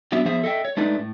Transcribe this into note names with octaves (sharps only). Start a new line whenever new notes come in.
F#3 B3 D4 E5
F3 B3 G#4 C5 E5
A4 D#5 E5 G5
C#5
G#3 A3 D4 D#4 B4
A2